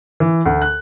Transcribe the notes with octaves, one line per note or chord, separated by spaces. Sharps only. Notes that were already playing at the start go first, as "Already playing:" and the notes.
E3
D2
F#6